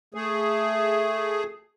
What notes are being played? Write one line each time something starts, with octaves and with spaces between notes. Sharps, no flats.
A3 G#4